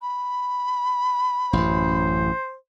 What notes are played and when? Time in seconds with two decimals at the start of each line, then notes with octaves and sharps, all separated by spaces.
0.02 B5
1.53 A1 F#2 C5